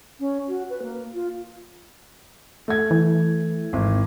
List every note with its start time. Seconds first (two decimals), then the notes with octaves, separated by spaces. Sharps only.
0.20 C#4
0.48 F#4
0.70 B4
0.82 A#3
1.14 F4
2.68 A3 G#6
2.91 E3
3.73 G#1